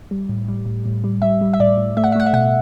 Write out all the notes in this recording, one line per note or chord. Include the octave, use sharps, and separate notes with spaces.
G3
A2
G3
A2
A2
G3
G3 E5
G3
E5
A2 D5
A2
A3 E5
F#5
E5
A3 F#5
E5
B2 F#5